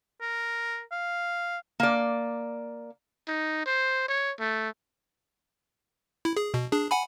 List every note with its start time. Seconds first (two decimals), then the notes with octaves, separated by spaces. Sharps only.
0.21 A#4
0.92 F5
1.80 A#3 D5
3.28 D#4
3.66 C5
4.08 C#5
4.40 A3
6.25 E4
6.37 G#4
6.54 B2
6.71 D4 G#4
6.91 F#5 G#5 B5